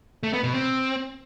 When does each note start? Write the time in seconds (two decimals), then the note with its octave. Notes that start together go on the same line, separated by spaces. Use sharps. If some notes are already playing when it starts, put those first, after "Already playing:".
0.23 A3
0.33 B3
0.44 B2
0.54 C4